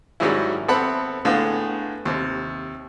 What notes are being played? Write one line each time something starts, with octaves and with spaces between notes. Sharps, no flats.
G#2 D#3 F#3 G3 C#4 E4
B3 C4 A4 E5 F#5 B5
A2 D3 G#3 B3 F4 G#4
D#2 C3